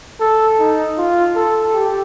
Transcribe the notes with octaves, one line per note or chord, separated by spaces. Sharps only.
A4
D#4
F4
A4
G4